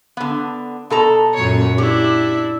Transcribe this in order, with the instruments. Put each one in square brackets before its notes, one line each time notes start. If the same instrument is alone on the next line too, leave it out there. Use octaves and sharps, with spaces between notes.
[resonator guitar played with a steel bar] D3 B3
B2 A4 A#5
[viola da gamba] F#2 A#2 C#5
[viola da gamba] D4 E4 [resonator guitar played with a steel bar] G4